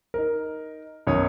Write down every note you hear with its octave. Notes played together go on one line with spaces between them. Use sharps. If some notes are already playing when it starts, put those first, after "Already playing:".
D#4 A#4
B1 F#2 B2 D#3 C#5 D#6